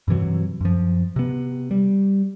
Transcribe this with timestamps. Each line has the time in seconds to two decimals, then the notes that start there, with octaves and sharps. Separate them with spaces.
0.08 G2 C3 E3 F#3
0.61 F#2 F3
1.16 C3 B3
1.71 G3